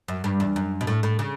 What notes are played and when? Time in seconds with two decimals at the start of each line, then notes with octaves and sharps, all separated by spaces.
0.08 F#2
0.24 G2
0.40 E2
0.56 F#2
0.81 B2
0.87 A2
1.03 A2
1.19 C#3